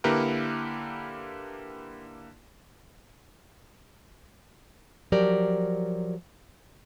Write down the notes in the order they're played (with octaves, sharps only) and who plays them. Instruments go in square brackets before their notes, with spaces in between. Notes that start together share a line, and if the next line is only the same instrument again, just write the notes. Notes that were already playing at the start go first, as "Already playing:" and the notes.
[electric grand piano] D3 A#3 E4 G4 A#4 B4
[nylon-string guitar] F3 F#3 G4 A#4 D5